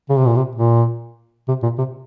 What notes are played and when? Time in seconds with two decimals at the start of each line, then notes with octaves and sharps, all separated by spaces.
0.10 C#3
0.18 C3
0.27 A#2
0.36 C3
0.55 A#2
1.48 C3
1.63 A#2
1.78 C3